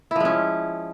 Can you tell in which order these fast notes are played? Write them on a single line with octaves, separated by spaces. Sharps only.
E4 F3 G#3 C#4